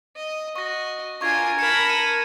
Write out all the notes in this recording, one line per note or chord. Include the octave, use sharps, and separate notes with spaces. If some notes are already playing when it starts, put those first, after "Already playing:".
D#5
F#4 D#5 C#6 A#6
D4 F4 A#4 G#5 C#6 G#6
A#4 A5 B5 C#7
C#7 D#7